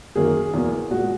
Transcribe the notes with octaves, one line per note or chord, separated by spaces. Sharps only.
F#2 D#3 A#3 G#4
E2 B2 F#3 A#3
A#2 G#3 F#4